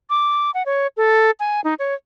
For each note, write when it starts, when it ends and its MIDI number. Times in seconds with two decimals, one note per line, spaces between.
0.10 0.51 86
0.54 0.63 78
0.66 0.87 73
0.97 1.31 69
1.40 1.61 80
1.64 1.74 63
1.79 1.94 73